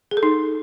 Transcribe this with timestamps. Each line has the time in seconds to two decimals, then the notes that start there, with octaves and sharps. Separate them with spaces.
0.11 G#4
0.17 A4
0.23 D#4